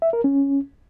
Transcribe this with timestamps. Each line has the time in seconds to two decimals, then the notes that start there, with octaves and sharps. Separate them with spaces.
0.02 E5
0.13 A#4
0.24 C#4